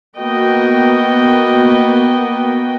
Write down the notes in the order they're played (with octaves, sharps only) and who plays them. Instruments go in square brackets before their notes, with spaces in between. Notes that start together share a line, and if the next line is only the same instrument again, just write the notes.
[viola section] A#3 B3 F#4 D#5 G5